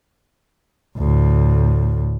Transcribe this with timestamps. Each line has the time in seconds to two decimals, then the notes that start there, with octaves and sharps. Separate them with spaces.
0.98 D2 A2